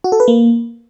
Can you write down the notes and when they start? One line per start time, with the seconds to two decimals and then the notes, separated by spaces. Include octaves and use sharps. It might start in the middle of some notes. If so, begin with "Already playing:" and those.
0.04 F#4
0.12 A4
0.20 B4
0.28 A#3